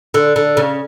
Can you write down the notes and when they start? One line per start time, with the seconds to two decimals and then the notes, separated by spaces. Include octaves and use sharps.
0.14 D3
0.36 D3
0.57 C#3